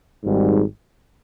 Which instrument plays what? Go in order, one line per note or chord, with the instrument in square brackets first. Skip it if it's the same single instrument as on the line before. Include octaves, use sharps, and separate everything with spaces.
[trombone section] G#1 G#2 G3